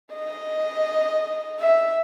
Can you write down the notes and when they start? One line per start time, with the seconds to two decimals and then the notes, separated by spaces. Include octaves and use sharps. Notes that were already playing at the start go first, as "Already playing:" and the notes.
0.14 D#5
1.61 E5